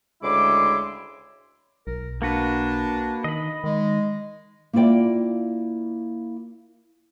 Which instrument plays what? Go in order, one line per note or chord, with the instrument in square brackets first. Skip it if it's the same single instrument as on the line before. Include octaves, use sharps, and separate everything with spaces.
[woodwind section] D2 C#3 G#3 E4 C6 D6
[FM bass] B1 [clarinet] A#4
[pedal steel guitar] A#3 F#4 B4 [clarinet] D4
[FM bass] D#3 [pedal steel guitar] D#5 B5
[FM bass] D#3 [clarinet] G#3
[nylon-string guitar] A#3 E4 F4 D5 G5